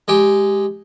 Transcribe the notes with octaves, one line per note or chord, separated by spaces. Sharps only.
G#3 G4